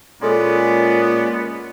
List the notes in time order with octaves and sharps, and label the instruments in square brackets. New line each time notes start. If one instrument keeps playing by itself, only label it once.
[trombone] A#2 [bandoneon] G#3 C#4 D5 [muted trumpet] B3 [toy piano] G#4 A4 C6